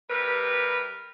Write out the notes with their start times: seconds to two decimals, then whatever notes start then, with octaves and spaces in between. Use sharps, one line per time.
0.10 C3 G3 A#4 B4